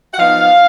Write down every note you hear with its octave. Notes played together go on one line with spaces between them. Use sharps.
F#5
F3 B3 D#4 F5